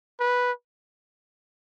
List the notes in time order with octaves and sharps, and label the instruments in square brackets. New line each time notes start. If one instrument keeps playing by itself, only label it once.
[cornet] B4